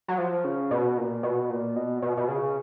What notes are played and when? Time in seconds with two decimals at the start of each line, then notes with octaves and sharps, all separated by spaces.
0.08 F#3
0.18 F3
0.44 C#3
0.71 B2
0.98 A#2
1.23 B2
1.50 A#2
1.76 B2
2.02 B2
2.17 B2
2.28 C#3